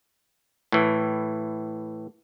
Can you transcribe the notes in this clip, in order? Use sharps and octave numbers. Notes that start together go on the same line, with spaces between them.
A2 E3